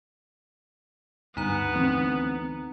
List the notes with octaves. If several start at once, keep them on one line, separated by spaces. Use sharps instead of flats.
D2 G2 B3 D#4 A#5
D2 E3 C4